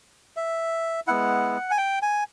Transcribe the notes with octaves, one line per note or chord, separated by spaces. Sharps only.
E5
G#3 B3 E4 F#5
G#5
G5
G#5